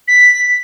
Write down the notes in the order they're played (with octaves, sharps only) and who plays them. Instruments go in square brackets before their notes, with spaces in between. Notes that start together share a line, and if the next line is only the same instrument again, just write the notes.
[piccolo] B6